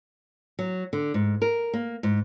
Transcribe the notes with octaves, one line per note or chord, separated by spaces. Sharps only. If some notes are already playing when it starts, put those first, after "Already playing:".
F#3
D3
G#2
A#4
A#3
G#2